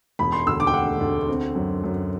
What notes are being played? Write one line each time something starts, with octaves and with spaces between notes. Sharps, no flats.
E1 B5
C6
D2 E6
D6
G5
A3 F#5
D2
C4
F#2
F#2